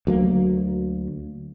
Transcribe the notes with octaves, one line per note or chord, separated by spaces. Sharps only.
D2 F#3 A#3